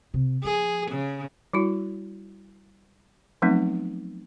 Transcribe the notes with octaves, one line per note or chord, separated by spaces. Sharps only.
C3
F3 G#4
C#3
G3 E4 F#4
F3 F#3 A3 B3 C4 D#4